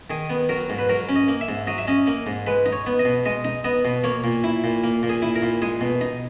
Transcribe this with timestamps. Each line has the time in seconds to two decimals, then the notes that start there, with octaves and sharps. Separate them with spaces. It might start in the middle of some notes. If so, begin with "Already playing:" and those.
0.10 D#3 G#4
0.30 B3
0.49 F#3 A#4
0.70 G#2
0.79 B4
0.89 F#3 A#4
1.09 C#4
1.16 D#5
1.28 A#3
1.41 E5
1.49 G#2
1.67 F#3 D#5
1.78 E5
1.88 C#4 D#5
2.07 A#3
2.27 G#2
2.47 G#3 B4
2.66 D#4
2.73 C#5
2.87 B3
2.99 D#5
3.05 B2
3.26 G#3 D#5
3.45 D#4
3.64 B3 D#5
3.85 B2
4.04 A#3 C#5
4.24 A#2
4.44 E4
4.64 A#2
4.84 A#3
5.03 A#2
5.10 G#4
5.22 E4
5.36 A#4
5.42 A#2
5.62 G#3 G#4
5.81 B2
6.01 D#4